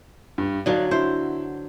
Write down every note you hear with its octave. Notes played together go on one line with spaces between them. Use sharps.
G2
D3 F#3 D4 D#4 F5
E4 C5